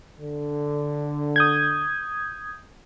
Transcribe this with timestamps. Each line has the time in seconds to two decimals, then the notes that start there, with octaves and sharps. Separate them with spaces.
0.18 D3
1.36 D#6 G6 G#6